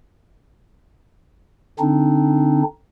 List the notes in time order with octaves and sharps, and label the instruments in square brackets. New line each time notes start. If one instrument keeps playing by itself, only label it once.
[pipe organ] D3 C4 D4 D#4